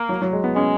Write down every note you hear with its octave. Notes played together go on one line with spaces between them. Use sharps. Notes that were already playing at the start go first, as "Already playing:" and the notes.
Already playing: A#3
F#3
F#3
G#3
B3
G#3 C#4